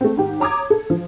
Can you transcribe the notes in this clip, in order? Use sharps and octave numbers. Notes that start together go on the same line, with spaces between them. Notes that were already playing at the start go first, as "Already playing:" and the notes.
A3 C4
G#2 D#3 G4
C#5 A#5 D6 D#6 G#6
A4
F3